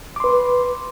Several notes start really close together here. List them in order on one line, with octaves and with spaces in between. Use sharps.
D6 C6 B4